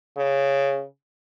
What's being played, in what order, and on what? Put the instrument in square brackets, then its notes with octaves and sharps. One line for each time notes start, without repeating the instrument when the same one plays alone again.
[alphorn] C#3